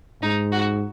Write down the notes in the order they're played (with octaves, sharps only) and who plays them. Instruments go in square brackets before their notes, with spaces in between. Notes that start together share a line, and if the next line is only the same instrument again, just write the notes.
[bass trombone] G#2 [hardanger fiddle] D#4
[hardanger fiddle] F#4